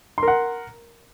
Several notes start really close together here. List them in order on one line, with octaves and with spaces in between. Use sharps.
C6 A#4 F#5